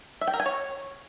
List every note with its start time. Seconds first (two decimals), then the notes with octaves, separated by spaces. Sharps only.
0.21 E5
0.27 G5
0.34 A#4
0.40 G#5
0.46 C#5